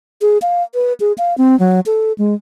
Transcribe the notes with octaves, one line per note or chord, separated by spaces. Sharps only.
G#4
F5
B4
G#4
F5
C4
F#3
A4
G#3